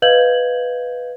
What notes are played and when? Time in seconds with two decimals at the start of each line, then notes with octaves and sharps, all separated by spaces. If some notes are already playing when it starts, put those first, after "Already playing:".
0.02 B4 D#5 F5 G6 G#6 F#7